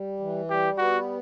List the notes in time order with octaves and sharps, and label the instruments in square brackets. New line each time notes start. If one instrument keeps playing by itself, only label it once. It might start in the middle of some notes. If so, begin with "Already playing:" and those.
Already playing: [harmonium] G3
E3
[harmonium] G3 [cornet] G4
[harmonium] B3 [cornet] F#4